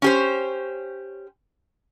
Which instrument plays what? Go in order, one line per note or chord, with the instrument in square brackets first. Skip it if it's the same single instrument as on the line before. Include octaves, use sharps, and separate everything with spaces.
[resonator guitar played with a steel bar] C#4 G4 C5